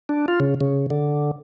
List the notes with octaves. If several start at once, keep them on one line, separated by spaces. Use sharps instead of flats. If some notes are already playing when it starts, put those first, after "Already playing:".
D4
F4
C#3
C#3
D3